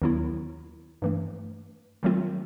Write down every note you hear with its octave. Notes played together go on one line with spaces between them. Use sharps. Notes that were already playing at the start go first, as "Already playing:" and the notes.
D#2 D#3 F#3 B3 E4
G2 E3 A3
D#3 F#3 A3 C4 F4